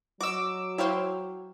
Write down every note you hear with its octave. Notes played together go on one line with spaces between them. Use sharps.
F#3 F#4 D#5 D6 E6
E4 C5 C#5 F5 G5